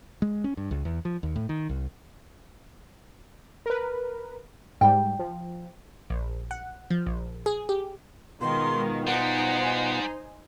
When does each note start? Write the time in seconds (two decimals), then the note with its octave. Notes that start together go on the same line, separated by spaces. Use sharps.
0.22 G#3
0.44 C#4
0.57 G2
0.71 C#2
0.85 E2
1.05 F3
1.23 D#2
1.36 A2
1.49 D#3
1.69 C2
3.66 A#4 B4
4.81 G#2 G3 G5
5.19 F3
6.10 A#1
6.51 F#5
6.90 F3
7.06 A#1
7.46 G#4
7.69 G4
8.41 B2 D#3 G#3 B3 F4 C6
9.07 G3 D#4 C5 F#5 G#5